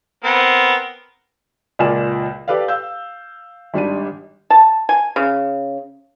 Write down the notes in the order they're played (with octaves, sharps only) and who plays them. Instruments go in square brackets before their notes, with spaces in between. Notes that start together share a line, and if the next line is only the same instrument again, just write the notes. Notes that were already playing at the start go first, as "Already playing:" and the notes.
[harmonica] B3 C4 A#4
[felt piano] C#2 A#2 A#4 D5 G#5 E7
G4 A4 B4 D5 F5
F5 E6 G6
G#1 G3 D4 D#7
[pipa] A5
G#5
C#3